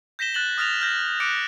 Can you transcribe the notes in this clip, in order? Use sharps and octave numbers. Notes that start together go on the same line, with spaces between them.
G6 A#6 B6 E7 G7
F#6 A6 E7 F#7 G7
D#6 F6 A6 A#6 F7
F6 G6 A#6
D6 F#6 C#7 D7